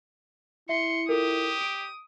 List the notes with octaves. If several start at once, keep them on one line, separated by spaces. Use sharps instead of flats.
E4 E5 C6 C#7
F4 G4 A4 A#4 D#6
D7